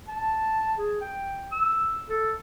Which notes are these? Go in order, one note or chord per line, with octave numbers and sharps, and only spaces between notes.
A5
G#4
G5
E6
A4